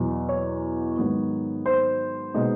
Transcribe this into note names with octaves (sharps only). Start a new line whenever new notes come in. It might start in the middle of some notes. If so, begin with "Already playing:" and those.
Already playing: E2 B2 F#3
C#5
G#2 D#3 F#3 B3
C5
B2 G#3 B3 D#4